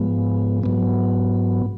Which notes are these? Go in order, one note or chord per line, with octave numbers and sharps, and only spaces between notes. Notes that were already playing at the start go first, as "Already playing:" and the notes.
Already playing: G#2 F3 G#3 B3
G#2 F#3 B3